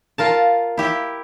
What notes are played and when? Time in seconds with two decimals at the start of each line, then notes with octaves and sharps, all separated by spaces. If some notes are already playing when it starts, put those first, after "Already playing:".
0.18 F4 A#4 A5
0.78 E4 G4 E5